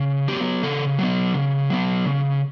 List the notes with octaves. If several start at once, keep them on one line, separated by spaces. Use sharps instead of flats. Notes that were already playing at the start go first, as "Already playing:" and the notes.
Already playing: C#3
F#3 B3 G4
C#3 A4
F#3 B3
C#3
F#3 B3
C#3